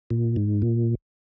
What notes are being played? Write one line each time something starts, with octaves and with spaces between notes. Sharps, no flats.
A#2
G#2
A#2